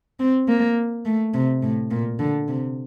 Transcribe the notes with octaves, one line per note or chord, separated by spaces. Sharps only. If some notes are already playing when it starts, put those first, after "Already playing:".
C4
A#3
A3
C3
A2
A#2
D3
C3